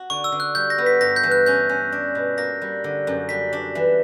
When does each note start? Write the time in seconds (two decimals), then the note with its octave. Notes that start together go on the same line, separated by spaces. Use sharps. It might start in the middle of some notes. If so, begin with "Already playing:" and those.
Already playing: F#4
0.10 D3 C#6
0.24 E6
0.32 D3
0.40 F#6
0.55 G3 G6
0.70 A#6
0.78 B3
0.86 B6
1.01 G2 A#6
1.16 G6
1.23 E3
1.31 F#6
1.46 C#4 G6
1.69 C#4
1.92 D4
2.15 B2
2.37 A#3 A#6
2.62 G3
2.84 D3
3.07 F#2
3.29 G3 B6
3.53 D4
3.75 E3